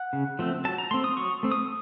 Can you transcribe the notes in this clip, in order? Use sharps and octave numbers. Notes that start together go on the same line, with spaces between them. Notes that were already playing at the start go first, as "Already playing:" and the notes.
Already playing: F#5
C#3
F3 A3 C4
F#3 A5
A#5
A3 C4 C6
D#6
F#3 C#6
A3 C4
D#6